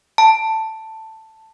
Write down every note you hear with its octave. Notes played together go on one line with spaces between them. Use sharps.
A5